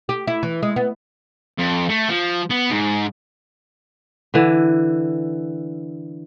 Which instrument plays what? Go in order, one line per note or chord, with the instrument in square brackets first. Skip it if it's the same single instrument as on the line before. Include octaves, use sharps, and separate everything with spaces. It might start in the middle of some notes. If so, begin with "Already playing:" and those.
[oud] G4
E4
E3
G#3
B3
[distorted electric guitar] F2
A3
F3
B3
G#2
[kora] D3 E3